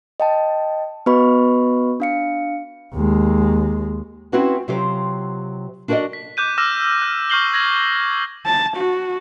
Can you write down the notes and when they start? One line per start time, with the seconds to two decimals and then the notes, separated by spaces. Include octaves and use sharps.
0.20 D#5 G5 A5
1.06 B3 F#4 B4 D#5 B5 C#6
2.00 D4 F5 C#7
2.94 D#2 G#3
4.32 C4 C#4 E4 F#4 B4 C5
4.68 C3 F#3 F4 G4 C5
5.88 D4 F#4 A#4 C5 D5 D#5
6.13 B6
6.37 D6 F#6 G6 D#7
6.58 D6 E6 F6 A#6 E7
7.02 F6 F#6
7.30 C#6 F6 G6 C7 F#7 G7
7.53 G#6 A#6 F#7
8.46 A5
8.76 F#4